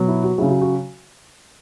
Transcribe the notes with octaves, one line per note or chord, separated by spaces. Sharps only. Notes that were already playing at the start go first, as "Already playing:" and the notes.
Already playing: B2 F#3
E4
F#4
C#3 F#3 E4 G#4
F#4
F#4